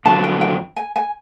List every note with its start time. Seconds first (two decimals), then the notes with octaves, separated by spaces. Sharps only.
0.05 F2 D3 F#3 A5
0.24 G5
0.41 G5
0.76 G#5
0.96 G#5